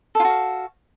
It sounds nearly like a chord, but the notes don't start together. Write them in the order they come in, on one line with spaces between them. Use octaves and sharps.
A4 F4 F#4 F5